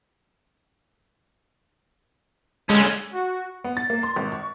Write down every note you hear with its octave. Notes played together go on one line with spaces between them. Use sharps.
D3 G#3 C#4
F#4
B3
A6
A#3
C6
G#1
C#6